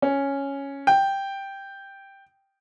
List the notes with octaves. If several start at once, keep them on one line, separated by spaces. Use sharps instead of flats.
C#4
G5